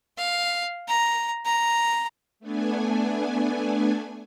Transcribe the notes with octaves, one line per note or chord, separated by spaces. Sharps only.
F5
A#5
A#5
A3 B3 D4 G#5